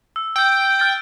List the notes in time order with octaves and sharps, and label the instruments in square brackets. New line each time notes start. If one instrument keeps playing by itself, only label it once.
[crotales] E6
[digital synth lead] G5 [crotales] E6 G6
[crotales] F6 A6 D7